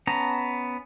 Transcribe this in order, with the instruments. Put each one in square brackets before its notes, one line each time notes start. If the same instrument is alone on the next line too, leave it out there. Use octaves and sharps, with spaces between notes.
[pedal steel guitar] B3 C#4 A5 A#5